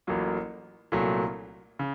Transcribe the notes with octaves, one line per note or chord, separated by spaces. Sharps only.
A1 A2 F#3 A#3 F4
C2 A#2 F#3 A3
C#3